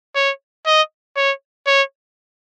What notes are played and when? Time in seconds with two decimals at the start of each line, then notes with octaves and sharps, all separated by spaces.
0.15 C#5
0.66 D#5
1.16 C#5
1.67 C#5